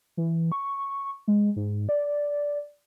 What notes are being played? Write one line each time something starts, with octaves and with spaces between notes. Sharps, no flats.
E3
C#6
G#3
G#2
D5